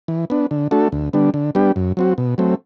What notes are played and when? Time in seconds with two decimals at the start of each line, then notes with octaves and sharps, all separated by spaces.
0.08 E3
0.30 B3 D4
0.51 D3
0.71 A3 D4 F#4 A4
0.92 D2
1.13 D3 G3 B3 D4
1.34 D3
1.55 G3 B3 D4 G4
1.76 F#2
1.97 F#3 C4 F#4
2.18 B2
2.38 F#3 A3 C4